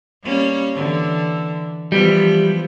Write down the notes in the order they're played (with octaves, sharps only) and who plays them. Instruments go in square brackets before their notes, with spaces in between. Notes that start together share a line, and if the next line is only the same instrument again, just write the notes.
[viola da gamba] G3 A#3 C#4
D3 E3
[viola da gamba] E3 F3 B3 [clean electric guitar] G3